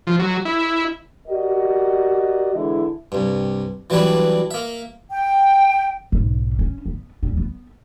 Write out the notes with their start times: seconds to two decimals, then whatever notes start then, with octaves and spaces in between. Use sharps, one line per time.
0.07 F3
0.19 F#3
0.45 E4
1.28 F#4 G4 A#4 D5 D#5
2.54 D3 E3 G#3 E4
3.12 C2 G2
3.90 E3 F#3 G3 D4 B4
4.51 A#3 E5
5.11 G5
6.12 B1 G#2
6.59 C#4
6.86 B3
7.23 D#1 C#4
7.37 B3